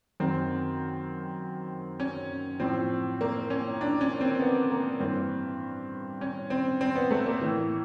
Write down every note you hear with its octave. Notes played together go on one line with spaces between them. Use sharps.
F#2 D#3 C4
C#4
A2 F3 C4
A#3
C#4
D4
C#4
C4
B3
A#3
G2 E3 C4
C#4
C4
C4
B3
A3
A#3
A2 E3